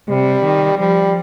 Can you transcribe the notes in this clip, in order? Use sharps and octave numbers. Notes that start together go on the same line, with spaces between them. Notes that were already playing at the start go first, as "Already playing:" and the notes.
C3 G3
D#3
F3 G3